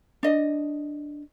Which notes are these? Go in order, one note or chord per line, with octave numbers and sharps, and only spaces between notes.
D4 D#5